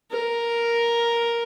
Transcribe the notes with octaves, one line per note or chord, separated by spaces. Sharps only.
A#4